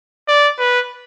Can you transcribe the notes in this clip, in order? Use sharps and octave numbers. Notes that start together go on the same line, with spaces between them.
D5
B4